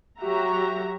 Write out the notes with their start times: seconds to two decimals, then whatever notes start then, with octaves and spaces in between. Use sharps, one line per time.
0.19 F#3 F#4 G4 E5 A#5